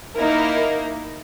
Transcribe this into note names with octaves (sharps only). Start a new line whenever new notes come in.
A#3 D#4 E4 A#4